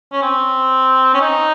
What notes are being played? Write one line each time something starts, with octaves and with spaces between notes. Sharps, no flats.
C#4
C4
C#4
D#4